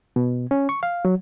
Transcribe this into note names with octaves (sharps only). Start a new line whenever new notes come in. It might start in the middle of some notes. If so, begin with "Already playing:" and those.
B2
C#4
C#6
F5
F#3